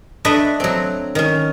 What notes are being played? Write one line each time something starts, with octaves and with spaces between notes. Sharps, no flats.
A3 D4 B4 D#5 E5
F#3 C4
D#3 C#4